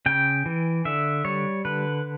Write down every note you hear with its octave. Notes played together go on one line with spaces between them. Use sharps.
C#3 G5
E3
D3 E5
G3 C#5
D3 B4